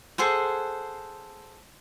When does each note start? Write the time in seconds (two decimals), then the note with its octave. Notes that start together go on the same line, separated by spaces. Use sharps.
0.18 G#4 A4 C5 F#5